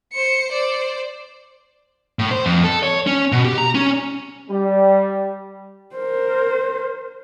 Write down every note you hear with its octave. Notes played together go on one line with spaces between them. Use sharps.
C5 C#7
C5 D5
A2
C5
F2
A4
C#5
C#4
B2
G4
A#5
C#4
G3
A#4 C5